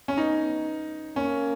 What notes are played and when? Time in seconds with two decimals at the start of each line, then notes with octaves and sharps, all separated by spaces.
0.08 C#4
0.17 B3 D#4
1.16 A#3 C#4